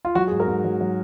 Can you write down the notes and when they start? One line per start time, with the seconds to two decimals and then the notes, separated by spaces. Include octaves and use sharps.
0.05 F4
0.15 F#3 F#4
0.27 G#4
0.31 G#2
0.40 A#4
0.48 G#2
0.64 F#3
0.81 F#3